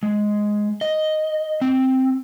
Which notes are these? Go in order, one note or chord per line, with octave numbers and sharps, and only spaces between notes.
G#3
D#5
C4